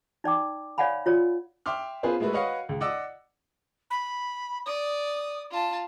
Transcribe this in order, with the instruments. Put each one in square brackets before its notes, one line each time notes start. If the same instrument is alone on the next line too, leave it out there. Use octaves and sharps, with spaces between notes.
[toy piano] D#4 D5 G5 D6
C#5 D5 F5 F#5 G#5 B5
F4 C#5 D5
[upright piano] E5 G5 C6 D6 F6
B3 C#4 F4 G#4 B4 C5
G#3 A3 E4 F#4 B4
F#4 B4 C#5 D#5 F5 F#5
C#2
D5 D#5 F#5 D6 E6
[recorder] B5
[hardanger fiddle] D5 [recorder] D#6
[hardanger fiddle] F4 A5